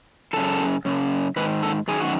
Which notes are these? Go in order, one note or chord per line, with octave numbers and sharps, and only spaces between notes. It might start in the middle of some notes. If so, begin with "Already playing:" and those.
F#2 C#3 E3 A4
F#2 C#3
G#2 D#3 B4
A4
F#2 D#3 G#4
F#4